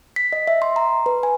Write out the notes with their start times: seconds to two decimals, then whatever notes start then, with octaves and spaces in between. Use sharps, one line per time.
0.16 B6
0.33 D#5
0.47 E5
0.62 C6
0.76 A#5
1.06 B4
1.23 G#5